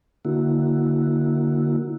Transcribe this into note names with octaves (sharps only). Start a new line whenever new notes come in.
D3 A#3 E4 F#4